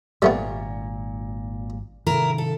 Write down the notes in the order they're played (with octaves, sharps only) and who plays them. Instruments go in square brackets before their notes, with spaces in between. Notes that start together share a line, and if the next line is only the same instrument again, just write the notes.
[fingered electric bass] G#1 [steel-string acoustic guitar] A#2 [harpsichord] G3 A3 B3
[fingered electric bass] C3 D#3 [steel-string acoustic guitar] E4 A#4
[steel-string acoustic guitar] A4